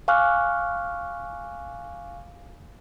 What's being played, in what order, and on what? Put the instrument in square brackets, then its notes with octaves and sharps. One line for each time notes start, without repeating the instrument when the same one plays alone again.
[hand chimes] F5 G#5 C#6 D6 F6 F#6